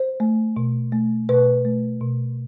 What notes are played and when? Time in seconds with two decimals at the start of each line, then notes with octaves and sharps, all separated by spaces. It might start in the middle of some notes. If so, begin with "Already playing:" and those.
Already playing: C5
0.20 A3
0.57 B2
0.92 A3
1.29 B2 B4
1.65 A3
2.01 B2